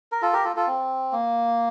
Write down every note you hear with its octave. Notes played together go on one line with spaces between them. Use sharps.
A#4
F4 A4
G4 A#4
F4 A4
F4 A4
C4
A#3